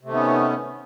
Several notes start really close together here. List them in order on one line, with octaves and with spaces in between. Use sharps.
C3 A3 D#3 B3 C#4